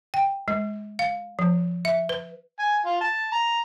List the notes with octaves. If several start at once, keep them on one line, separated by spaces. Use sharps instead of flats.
G5
G#3
F5
F3
E5
B4
G#5
F4
A5
A#5